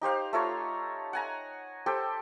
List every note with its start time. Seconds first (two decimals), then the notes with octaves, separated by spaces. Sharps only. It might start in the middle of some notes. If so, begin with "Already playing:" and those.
0.01 D#4 G4 C5 F5
0.33 A3 F4 C#5 A#5
1.13 F#5 G#5 A#5
1.86 G4 A4 C5 G5